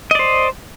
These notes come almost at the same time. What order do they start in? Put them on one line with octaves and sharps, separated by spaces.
D#5 D5 C5